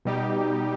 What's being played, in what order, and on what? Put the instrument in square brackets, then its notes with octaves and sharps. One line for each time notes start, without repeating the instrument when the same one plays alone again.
[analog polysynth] B2 G3 D#4 G4